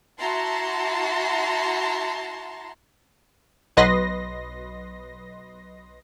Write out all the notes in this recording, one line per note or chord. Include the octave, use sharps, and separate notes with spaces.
E4 F#4 A5 A#5 C6
B1 F#3 B4 D#5 C6 A#6